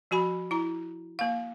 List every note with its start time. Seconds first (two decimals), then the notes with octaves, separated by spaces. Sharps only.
0.11 F3 F#4 G#5 B5
0.51 E4 A#5
1.19 A#3 F5